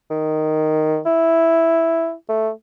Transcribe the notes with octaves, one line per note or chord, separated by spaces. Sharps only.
D#3
E4
A3